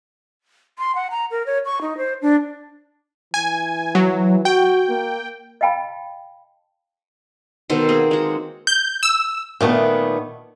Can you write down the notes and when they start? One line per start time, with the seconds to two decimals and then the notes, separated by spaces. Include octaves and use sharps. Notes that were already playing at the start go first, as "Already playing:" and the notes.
0.79 C6
0.95 F#5
1.11 A#5
1.31 A#4
1.46 C#5
1.65 C#6
1.82 D#4
1.97 C5
2.22 D4
3.34 E3 G#5
3.95 F#3
4.45 F#4 G5
4.89 A#3
5.61 D#5 F5 G5 A5 B5
7.70 B2 D#3 A4 C5
7.89 A#3 C4 G#4
8.11 G#3 F#4
8.67 G6
9.03 E6
9.61 A#2 D#3 A3 B3